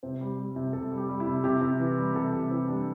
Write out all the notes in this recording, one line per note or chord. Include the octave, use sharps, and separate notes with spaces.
C3 C5
G3
G3
C3
C3 A4
G3
G4
G3
E4
C3
C3 G4
C3
E3
G3
C3 A4
C3
E3 C4
G3 D4